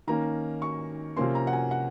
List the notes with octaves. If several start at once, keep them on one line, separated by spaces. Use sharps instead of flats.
D#3 A#3 C#4 A#5
C#6
C3 F3 A#3 C#4 C6
A#5
F#5
G#5
F#5